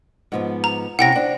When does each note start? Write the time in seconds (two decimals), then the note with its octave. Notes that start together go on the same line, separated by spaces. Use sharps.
0.32 G#2 F3 B3
0.64 A#5
0.99 C3 C#4 E4 F#5 G5 A#6
1.15 D4 C5